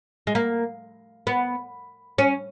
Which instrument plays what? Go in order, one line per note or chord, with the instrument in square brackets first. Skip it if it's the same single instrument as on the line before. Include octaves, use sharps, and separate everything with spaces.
[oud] G#3
A#3
B3
C#4